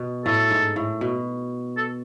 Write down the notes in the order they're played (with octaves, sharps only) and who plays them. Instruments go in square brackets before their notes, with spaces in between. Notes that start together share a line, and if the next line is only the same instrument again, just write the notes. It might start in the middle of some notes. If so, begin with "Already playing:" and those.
Already playing: [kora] B2
[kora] A2 [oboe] A4
[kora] G#2
A2
B2
[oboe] A4